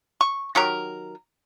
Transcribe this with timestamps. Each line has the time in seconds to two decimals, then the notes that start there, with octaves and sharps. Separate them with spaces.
0.21 C#6
0.55 D#3 F#3 G4 A#4